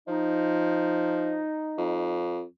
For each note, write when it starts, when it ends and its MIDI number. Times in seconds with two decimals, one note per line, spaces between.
0.08 1.44 53
0.08 2.21 63
1.78 2.43 41